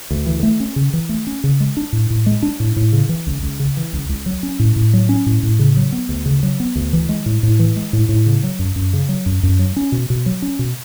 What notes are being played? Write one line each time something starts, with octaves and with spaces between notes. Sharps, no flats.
D2
E3
A3
C#4
C#3
E3
A3
C#4
C#3
G#3
D4
A2
A2
G#3
D4
A2
A2
C#3
E3
C#2
C#2
C#3
E3
C#2
C#2
F#3
C#4
A2
A2
F#3
C#4
A2
A2
C#3
F#3
B3
D2
C#3
F#3
B3
D2
E3
G#3
A2
A2
E3
G#3
A2
A2
C#3
F#3
F#2
F#2
C#3
F#3
F#2
F#2
F#3
C#4
B2
B2
F#3
C#4
B2